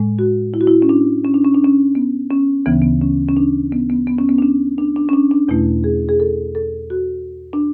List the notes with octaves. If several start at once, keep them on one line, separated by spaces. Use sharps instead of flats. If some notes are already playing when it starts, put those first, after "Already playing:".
Already playing: A2 G#3
F#4
E4
F#4
E4
C#4
D4
C#4
D4
C#4
D4
C#4
B3
C#4
D2 C#3 E3 B3
B3
C#4
C#4
D4
B3
B3
B3
C#4
B3
D4
C#4
D4
D4
C#4
D4
D4
E2 B2 A3 E4
G#4
G#4
A4
A4
F#4
D4